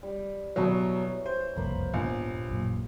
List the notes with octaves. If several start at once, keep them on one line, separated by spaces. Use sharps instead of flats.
G3
B2 E3 F#3 C#5 A#5
C5
F#1 C2 F2 A#3 B5
D#1 A#1 G#2 B3
A1 F#2 A#2